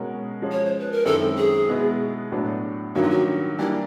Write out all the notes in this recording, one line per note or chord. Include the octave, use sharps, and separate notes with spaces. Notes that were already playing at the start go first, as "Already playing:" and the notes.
Already playing: B2 G#3 C#4 F#4 A#4
F3 G#3 C#4
C#5
C5
B4
A#4
F#2 D#3 G#3 C4 E4 A4
G#4
B2 G#3 B3 E4
A2 F#3 B3 D4
G2 D#3 F#3 A#3 C#4 F#4
F4
F#4
E3 G3 A#3 D4 E4 G4